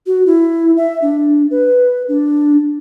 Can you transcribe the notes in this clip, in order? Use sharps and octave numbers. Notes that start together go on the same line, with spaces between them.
F#4
E4
E5
D4
B4
D4